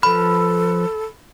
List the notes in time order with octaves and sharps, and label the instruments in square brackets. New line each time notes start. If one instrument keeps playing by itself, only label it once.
[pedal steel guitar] F3 B4 F6 [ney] A4 [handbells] B5